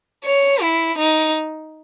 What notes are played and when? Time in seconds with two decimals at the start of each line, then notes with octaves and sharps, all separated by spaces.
0.25 C#5
0.61 E4
0.99 D#4